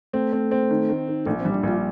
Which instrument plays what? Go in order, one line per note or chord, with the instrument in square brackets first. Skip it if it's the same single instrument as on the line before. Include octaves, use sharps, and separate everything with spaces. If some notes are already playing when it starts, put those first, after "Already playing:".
[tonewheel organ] A3 [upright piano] C4
[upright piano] C4
C4
D#3
D#3
D#3
[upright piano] A#1 [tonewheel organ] A3
[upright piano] G3 [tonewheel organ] C4
[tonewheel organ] D4
[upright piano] A#1 [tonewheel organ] F4